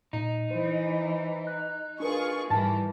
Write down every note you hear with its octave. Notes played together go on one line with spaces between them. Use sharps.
A#2 D#4
E3 C5
F#6
D4 F4 G#4 A#4 B4 C#6
G#2 D#3 E3 G3 A5